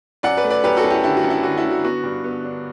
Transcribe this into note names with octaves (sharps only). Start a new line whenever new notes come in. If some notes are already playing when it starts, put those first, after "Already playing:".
F#2 D5 F#5
B4 D5
A3
B4 D5
F#2 G4 B4
F#4 A4
F#2
E4 G4
D3 E4 G4
F#4
F#2
E4
D3 F#4
E4
D3
F#4
B3 F#4
G2
B3
D4